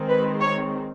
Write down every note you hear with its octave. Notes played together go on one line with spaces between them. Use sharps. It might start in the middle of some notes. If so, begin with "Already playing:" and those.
Already playing: D#3 G#3 C4
B4
C#5